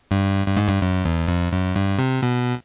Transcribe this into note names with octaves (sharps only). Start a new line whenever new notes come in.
G2
G2
G#2
G2
F#2
E2
F2
F#2
G2
C3
B2